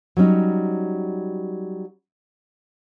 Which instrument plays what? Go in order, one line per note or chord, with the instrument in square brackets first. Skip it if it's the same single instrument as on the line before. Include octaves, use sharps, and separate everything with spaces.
[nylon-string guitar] F#3 G3 C#4 D#4